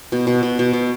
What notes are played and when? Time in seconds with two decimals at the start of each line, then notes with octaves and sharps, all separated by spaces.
0.12 B2
0.27 B2
0.43 B2
0.59 B2
0.73 B2